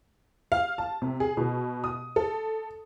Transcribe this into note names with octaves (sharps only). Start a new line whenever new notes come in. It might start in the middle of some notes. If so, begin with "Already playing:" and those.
F5
A5
C3
G#4
B2
D#6
A4